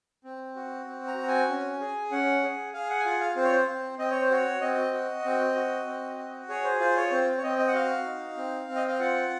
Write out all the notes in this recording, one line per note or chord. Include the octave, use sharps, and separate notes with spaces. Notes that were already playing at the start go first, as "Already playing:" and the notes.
C4
F#4
C4
A#5
F#4
G#5
C#4
G#4
C#4 F#5
G#4
G#4 F5
F#5
G#5
F4 F#5
F5
C4 C5
C#5
C5
C4
C4 D#5
C#5
C5
F#4 C#5
C4 D#5
F#4
C4
F#4
C4
F#4
G#4 C#5
C5
F4 C5
C#5
C4 C5
C#5
C4 D#5
D#5
F#5
F#4 F5
D#4
C4
C4
D#5
F5
F4 F#5